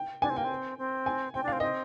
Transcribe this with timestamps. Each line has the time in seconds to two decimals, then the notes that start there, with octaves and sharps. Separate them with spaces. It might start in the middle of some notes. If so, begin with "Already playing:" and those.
Already playing: G5
0.22 D4 G#5
0.30 C4
0.36 A#3 G5
0.44 C4
0.78 C4
1.06 G#5
1.34 C4 G5
1.43 D4
1.48 C4 F5
1.60 C4 D#5